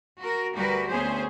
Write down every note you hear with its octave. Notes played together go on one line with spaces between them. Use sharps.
F#4 A#4
D2 G3 F#4 A#4 B4
D2 B3 C#4 G#4 C5